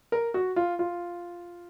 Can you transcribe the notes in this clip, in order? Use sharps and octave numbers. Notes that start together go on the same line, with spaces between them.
A#4
F#4
F4
F4